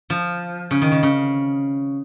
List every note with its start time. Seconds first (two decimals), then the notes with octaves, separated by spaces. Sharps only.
0.10 F3
0.71 C#3
0.81 D#3
0.92 C#3
1.03 C#3